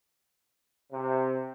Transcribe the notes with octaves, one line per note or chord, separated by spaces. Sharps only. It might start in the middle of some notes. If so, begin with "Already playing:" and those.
C3